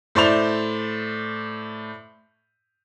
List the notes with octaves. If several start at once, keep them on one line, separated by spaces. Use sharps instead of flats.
A2 C5 D5 E5 C6 F7